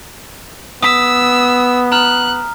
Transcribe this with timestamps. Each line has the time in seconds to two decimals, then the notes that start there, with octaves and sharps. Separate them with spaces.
0.82 B3 D#6 E6 B6
1.92 A#5 F6 F#6